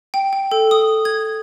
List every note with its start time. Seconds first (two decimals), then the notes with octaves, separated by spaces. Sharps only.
0.14 G5
0.33 G5
0.51 A4
0.71 D#6
1.05 G#6